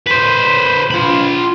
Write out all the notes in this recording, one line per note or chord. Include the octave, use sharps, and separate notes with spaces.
B4 C5
F4 B5